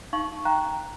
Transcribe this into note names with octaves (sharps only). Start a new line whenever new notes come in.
D#4 F5 C#6 F#7
F5 G5 A#5 F#6